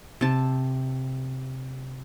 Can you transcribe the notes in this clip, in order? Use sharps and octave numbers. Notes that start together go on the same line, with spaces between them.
C3 A5